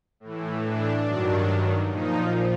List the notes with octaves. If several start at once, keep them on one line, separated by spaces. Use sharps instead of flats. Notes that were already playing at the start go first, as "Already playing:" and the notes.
A2 E3
D4
G2 D#3 F#3
A#2 F3 D#4